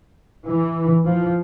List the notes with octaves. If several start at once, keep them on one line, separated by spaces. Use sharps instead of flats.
E3
F3